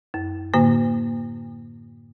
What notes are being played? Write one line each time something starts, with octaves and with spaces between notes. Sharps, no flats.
F#2
A2 D3 A#3